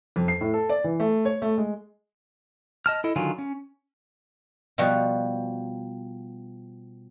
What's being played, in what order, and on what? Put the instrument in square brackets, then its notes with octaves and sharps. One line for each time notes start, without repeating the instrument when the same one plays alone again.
[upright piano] F2
C7
A2
A4
D5
E3
A3
C#5
A3
G#3
[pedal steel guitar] D#5 A5 F6
E4 A4 D#5
D3 D#3 F#3 F4 G#5
C#4
[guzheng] B2 F3 G3 F#4